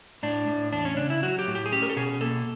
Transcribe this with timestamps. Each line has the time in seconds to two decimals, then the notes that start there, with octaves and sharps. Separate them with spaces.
0.23 A2 D4
0.48 A2
0.73 E2 D4
0.85 C#4
0.97 C#3 D4
1.10 E4
1.23 F#3 F#4
1.39 G4
1.47 A2
1.55 G4
1.66 G#4
1.72 C#4 G4
1.82 A#4
1.90 A4
1.96 B2 G#4
2.21 A#3 A4